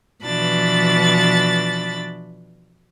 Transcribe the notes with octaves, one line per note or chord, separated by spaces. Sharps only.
B2 E3 F3 D4 B5 A6